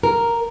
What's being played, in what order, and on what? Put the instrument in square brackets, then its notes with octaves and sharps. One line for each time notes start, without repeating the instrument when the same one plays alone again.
[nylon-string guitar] A#4